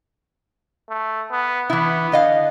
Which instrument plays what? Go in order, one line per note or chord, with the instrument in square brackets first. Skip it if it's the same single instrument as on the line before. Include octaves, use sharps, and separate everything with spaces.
[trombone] A3
B3
[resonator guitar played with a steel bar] E3 E4 [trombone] B3
[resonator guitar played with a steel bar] D3 D#5 F5